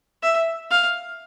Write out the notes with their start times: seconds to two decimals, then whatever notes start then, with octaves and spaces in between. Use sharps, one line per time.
0.22 E5
0.71 F5